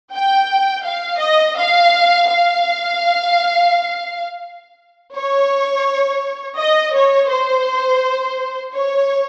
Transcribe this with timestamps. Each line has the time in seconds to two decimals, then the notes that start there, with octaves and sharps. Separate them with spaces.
0.13 G5
0.85 F5
1.20 D#5
1.56 F5
2.28 F5
5.15 C#5
6.58 D#5
6.94 C#5
7.31 C5
8.74 C#5